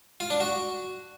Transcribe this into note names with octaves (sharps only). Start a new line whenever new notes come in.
F4
D4
F#4